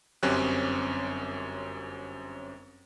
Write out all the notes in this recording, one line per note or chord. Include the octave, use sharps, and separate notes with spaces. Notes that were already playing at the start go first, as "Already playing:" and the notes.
G1 F#2 C4 C#4 G4 F#6